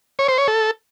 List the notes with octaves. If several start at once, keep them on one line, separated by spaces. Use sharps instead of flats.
C#5
C5
C#5
A4